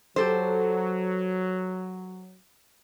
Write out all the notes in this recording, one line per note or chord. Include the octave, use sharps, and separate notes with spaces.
F#3 G4 A4 C5